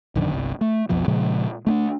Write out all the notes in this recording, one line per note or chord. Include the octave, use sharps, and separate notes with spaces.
A#1 F#2 D3 D#3
G1 C2
A3
B1 F2 B2 F3
A#2 C#3 F3 G#3
A3 C#4 D4